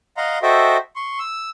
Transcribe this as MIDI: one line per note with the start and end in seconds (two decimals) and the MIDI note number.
0.17 0.38 75
0.17 0.38 77
0.17 0.38 78
0.17 0.38 82
0.17 0.38 84
0.42 0.77 66
0.42 0.77 69
0.42 0.77 72
0.42 0.77 75
0.42 0.77 76
0.42 0.77 79
0.96 1.19 84
0.96 1.19 85
1.19 1.50 88